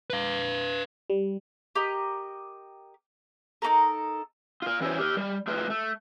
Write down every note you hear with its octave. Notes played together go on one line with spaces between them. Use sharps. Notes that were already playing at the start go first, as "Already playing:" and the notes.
B4 F5
G3
G4 A#4 D#5
D#4 F#4 A4 A#4
F4 A#4
E3 C#4 E4 F#4 C5 C#5
G4 A#4
G3
A3 F4 A#4 B4
A3